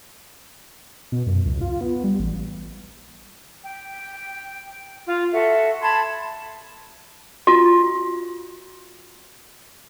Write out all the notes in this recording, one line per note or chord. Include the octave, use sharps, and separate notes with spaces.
B2
F#2
C#2
F4
B3
G3
A1
G5
F4
F#4 A4 E5
A5 B5 C6 G#6
F4 F#4